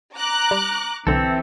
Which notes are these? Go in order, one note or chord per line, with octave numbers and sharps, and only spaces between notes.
A#5 D6 F#6
G3
B1 D3 E3 C4 A4